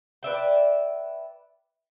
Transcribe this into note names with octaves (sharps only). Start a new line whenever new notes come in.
B4 D5 E5 G5